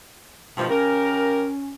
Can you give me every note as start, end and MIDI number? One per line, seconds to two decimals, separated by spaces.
0.57 0.68 43
0.57 0.70 47
0.57 0.68 51
0.57 0.68 53
0.57 0.70 57
0.70 1.47 49
0.70 1.74 61
0.70 1.47 67
0.70 1.47 70